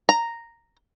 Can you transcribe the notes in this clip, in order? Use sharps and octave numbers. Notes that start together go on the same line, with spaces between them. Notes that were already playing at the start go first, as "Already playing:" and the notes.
A#5